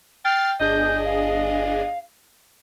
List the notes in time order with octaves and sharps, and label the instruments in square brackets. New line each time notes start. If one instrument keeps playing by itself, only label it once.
[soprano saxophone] G5 [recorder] F6 [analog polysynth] A6 C7
[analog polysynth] G1 D4 G#4 [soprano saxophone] D#5 [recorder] G6
[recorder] F5